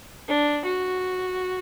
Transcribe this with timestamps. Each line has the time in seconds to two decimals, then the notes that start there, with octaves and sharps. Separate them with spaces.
0.28 D4
0.65 F#4